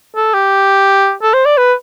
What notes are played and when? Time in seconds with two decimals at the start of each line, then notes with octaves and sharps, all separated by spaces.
0.16 A4
0.34 G4
1.22 A4
1.34 C5
1.46 D5
1.57 B4